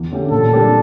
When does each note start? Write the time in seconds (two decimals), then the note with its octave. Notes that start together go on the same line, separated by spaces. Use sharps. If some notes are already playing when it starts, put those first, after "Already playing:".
Already playing: E2
0.12 D3 A3 C#4 G4
0.31 A#2 A4
0.51 G3 D4 G4 A#4